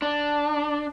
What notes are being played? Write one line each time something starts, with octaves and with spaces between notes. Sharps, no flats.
D4